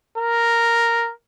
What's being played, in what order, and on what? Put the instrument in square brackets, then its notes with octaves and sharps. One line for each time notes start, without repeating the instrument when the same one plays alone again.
[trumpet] A#4